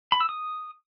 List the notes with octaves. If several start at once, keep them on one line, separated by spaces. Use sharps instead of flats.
B5
E6
D#6